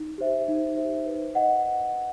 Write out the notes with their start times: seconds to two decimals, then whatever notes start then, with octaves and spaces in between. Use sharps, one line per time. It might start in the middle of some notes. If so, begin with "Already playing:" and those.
Already playing: D#4
0.18 G4 C5 E5
0.48 D#4
0.76 G4 C5 E5
1.06 B4
1.35 D#5 F#5